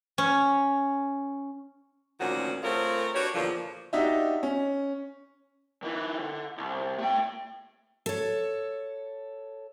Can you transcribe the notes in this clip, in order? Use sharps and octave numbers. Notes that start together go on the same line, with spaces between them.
C#4
D2 A#2 D#3 F3 C#4 F#4
A3 C4 F4 G#4 A#4 C#5
D4 F#4 G4 B4 C#5
E2 A#2 D3 F3
D4 D#4 F#4 G4 D#5 E5
C#4
D#3 E4
D3
C2
A3 G5
A4 C#5